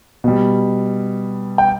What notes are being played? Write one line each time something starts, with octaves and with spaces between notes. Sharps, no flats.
B2 G3
G5